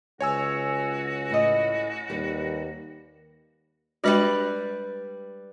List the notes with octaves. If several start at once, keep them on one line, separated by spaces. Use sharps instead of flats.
C#2 F#4 C#5 G#5 E6
A2 E4 D#5
D#2 G3 B4
G3 G#3 D4 F#4 B4 D5